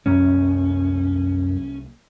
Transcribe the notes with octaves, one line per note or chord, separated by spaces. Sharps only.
C2 F#2 F#3 A#3 C#4